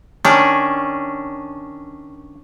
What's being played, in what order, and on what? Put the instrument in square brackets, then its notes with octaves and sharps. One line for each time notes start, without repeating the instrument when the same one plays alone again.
[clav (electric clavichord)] D#3 [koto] C#4 D4